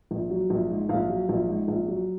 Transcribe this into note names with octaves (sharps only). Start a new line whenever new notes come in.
A#1
F#3
A#1
G#2
A#1 F5
F#3
A#1
G#2
A#1
F#3